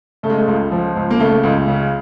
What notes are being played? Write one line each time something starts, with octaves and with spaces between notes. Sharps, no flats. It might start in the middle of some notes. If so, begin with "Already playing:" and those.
C#3 A3
G#3
A3
C#2
F3
C#2
A#3
C#3 A3
C#2
C#3